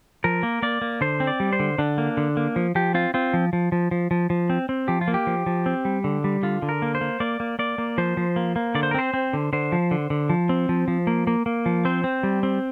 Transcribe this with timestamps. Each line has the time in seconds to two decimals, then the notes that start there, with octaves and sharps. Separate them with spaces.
0.24 F3 A#4
0.43 A#3
0.63 A#3 D5
0.82 A#3
1.01 D3 C5
1.20 C4
1.27 D5
1.40 G3
1.53 C5
1.60 D3
1.78 D3 D4
1.98 A#3
2.17 D3
2.37 A#3
2.56 F3
2.75 F3 G4
2.94 C4 F4
3.14 C4 F4
3.33 F3
3.53 F3
3.72 F3
3.91 F3
4.11 F3
4.30 F3
4.50 C4
4.69 C4
4.88 F3 G4
5.01 F4
5.08 A#3
5.14 G4
5.27 F3
5.46 F3
5.66 C4
5.85 G3
6.04 D3
6.24 G3
6.43 D3 F4
6.62 D3
6.69 A#4
6.82 A#3
6.95 C5
7.01 A#3
7.20 A#3 D5
7.40 A#3
7.59 A#3 D5
7.78 A#3
7.98 F3 C5
8.17 F3
8.36 A#3
8.56 A#3
8.75 D3 D5
8.83 C5
8.91 A#4
8.94 C4 C5
9.14 C4
9.33 D3
9.53 D3 C5
9.72 F3
9.91 D3
10.10 D3
10.30 F3
10.49 C4
10.69 F3
10.88 F3
11.07 A#3
11.27 A#3
11.46 A#3
11.66 F3
11.85 C4 C5
12.04 C4
12.23 G3
12.43 C4